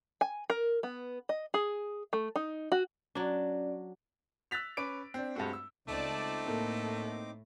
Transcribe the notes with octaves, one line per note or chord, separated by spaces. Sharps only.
G#5
A#4
B3
D#5
G#4
A3
D#4
F#4
F#3 C#4 D4 D5
E6 F#6 A6 B6 F7
C#4 B4 D6 D7
C4 D4
G2 G#3 A3 C4 F#4
E6
C#2 A3 C4 D#4 D5 A5 D6
A2 A#3 A4